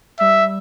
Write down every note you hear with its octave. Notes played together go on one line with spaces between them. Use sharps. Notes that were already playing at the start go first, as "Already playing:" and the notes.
G3 E5